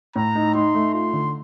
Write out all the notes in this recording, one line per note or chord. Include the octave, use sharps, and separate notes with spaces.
A2 A#5
D#4
D#4 C6
A3
F4 C6
D3